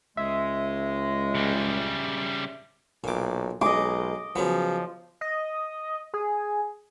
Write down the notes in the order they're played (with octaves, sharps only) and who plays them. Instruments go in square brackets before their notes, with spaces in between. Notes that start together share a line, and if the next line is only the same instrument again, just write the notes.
[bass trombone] C#2 [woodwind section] G#3 [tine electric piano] E5
[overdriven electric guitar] C#3 G3
[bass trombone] B1 [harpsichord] A#2 D6
[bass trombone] B1 [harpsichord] G#3 [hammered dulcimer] D#5 D6
[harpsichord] C#3 F#3 B3 [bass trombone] F3
[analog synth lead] D#5
G#4